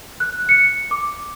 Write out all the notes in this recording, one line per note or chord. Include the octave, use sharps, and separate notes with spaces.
F#6
C#7
D6